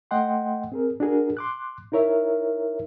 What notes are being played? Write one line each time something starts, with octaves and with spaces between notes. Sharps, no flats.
A3 D#5 F#5 G5 C6
C4 G#4 A#4
D4 F#4 G#4 A#4
C6 D6 F#6
D#4 E4 A#4 C#5 E5